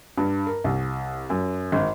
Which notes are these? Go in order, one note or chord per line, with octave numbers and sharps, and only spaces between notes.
G2
A#4
C2
F#2
G#1